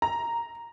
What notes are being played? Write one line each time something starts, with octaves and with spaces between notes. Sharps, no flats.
A#5